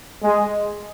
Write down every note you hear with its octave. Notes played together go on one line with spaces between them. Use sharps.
G#3